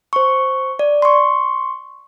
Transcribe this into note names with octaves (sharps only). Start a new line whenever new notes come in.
C5 C#6
D5
C6 C#6